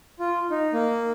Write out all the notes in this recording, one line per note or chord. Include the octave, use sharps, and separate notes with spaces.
F4
D#4
A#3